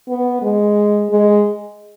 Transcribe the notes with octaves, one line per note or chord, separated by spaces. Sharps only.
B3
G#3
G#3